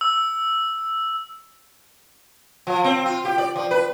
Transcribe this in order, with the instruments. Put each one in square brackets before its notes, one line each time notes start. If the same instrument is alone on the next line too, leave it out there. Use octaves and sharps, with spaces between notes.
[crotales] E6
[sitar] F3
C4
F4
G4
D5
F3
B4